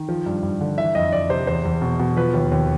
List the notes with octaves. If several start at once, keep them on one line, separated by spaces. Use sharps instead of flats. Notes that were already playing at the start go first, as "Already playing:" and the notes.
Already playing: D#3
F3
G2
G2
D3
E3 E5
F2 D#5
F2 D5
C3 C5
E2 C5
E2
B2
B2
F3 B4
D#2
D#2